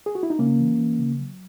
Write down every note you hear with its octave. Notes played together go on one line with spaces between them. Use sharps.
G#4
F#4
E4
D#4
C#3 A#3 C#4
E3
E3
C#3
F#3